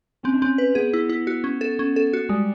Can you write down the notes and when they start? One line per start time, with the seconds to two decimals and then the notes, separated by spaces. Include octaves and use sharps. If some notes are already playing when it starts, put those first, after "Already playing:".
0.24 C4 C#4
0.34 D4
0.42 C4 C#4
0.58 B4
0.75 B3 G#4
0.93 E4
1.09 E4
1.27 F#4
1.44 C#4
1.61 A4
1.79 C#4
1.96 A4
2.13 F#4
2.29 G3 G#3